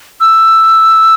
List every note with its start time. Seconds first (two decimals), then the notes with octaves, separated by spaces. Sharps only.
0.21 E6